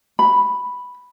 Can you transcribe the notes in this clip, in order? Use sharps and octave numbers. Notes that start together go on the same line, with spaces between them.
B5